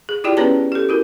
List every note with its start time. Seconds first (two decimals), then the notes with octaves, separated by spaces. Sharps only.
0.09 G#4
0.24 E4 F4 G4 D5 G5
0.37 B3 C#4 G#4 B4 C#5 A5
0.72 G4 A4
0.89 E4 F#4 A#4